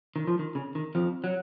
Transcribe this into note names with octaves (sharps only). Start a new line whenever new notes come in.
D#3
F3
D#3
C#3
D#3
F2 F3
F#3